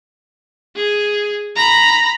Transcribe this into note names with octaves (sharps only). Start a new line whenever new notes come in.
G#4
A#5 B5